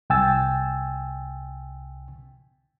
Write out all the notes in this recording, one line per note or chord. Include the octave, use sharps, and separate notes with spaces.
C2 G5 G#5 E6 A6